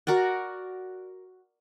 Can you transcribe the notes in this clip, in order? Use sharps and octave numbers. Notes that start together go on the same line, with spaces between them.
F#4 A#4 D5 F#5